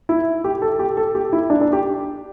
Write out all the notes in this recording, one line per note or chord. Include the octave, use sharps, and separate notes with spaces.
E4
G4
A4
G4
A4
G4
E4
D4
D4
G4